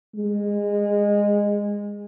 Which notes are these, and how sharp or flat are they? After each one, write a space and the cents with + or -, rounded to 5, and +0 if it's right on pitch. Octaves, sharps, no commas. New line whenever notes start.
G#3 -20